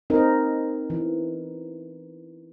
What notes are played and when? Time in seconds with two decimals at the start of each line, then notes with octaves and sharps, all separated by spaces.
0.10 C4 D#4 A#4
0.90 E3